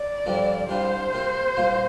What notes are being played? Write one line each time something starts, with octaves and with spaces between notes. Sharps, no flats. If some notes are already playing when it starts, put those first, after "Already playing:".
Already playing: D5
G2 D3 F3 C4 F4
C2 C3 G3 D4 F4 C5
C3 A#3 F4
C2 A#2 A#3 F4